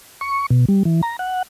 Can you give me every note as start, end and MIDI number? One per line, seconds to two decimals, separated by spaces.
0.21 0.46 85
0.50 0.65 47
0.68 0.83 55
0.85 1.01 52
1.03 1.16 82
1.19 1.42 78